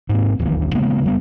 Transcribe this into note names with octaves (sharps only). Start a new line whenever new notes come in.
G#2 A#3 C4
D1 A1 D#2
C#3 G#3 A#3 B3
F1 G3 B3